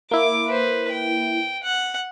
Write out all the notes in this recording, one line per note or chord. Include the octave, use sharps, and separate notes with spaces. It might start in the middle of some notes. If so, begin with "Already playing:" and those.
A#3 E4 D6
B4 C5
G5
F#5